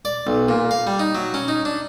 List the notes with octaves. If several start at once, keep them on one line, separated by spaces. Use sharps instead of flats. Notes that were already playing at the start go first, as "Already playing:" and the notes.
D5
B1
A#2
F5
G3
D#4
F#3
C#4
D#4
D4